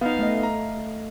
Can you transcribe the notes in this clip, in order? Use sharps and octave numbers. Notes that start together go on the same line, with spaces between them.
B3 D#4 F5
A3 D#5
A#5